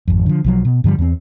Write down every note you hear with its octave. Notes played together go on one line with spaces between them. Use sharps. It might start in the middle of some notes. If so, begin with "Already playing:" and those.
G#1 F2
D3 F3
B1 F3 F#3
B2
G2 D3 F3 G3
E2 C4